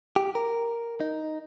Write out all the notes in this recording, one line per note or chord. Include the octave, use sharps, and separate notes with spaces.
G4
A#4
D#4